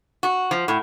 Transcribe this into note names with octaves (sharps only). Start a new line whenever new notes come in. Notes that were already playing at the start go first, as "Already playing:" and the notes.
F#4
F3
A2